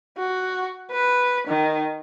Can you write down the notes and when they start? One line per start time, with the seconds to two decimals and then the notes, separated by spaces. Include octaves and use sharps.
0.17 F#4
0.91 B4
1.48 D#3